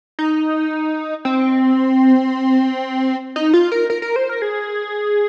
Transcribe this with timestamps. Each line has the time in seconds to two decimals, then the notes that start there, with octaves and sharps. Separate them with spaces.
0.19 D#4
1.25 C4
3.36 D#4
3.54 F4
3.72 A#4
3.90 A#4
4.02 A#4
4.16 C5
4.29 A#4
4.42 G#4